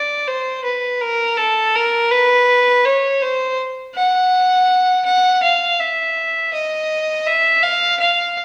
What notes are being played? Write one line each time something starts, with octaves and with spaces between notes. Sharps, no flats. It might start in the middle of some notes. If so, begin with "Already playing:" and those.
Already playing: D5
C5
B4
A#4
A4
A#4
B4
C#5
C5
F#5
F#5
F5
E5
D#5
E5
F5
F5